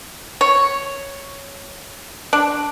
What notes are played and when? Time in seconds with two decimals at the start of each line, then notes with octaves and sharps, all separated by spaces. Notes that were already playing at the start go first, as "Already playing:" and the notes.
0.41 C#5
2.33 D4